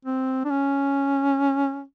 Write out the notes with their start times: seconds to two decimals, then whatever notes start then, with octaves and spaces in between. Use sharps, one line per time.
0.05 C4
0.45 D4
0.50 C#4